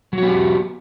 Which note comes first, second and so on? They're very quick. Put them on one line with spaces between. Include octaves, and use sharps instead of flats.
F#3 F#4 B3 G4